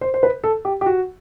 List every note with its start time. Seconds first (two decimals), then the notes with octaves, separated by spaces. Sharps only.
0.01 C5
0.14 C5
0.23 B4
0.44 A4
0.65 G4
0.81 G4
0.86 F#4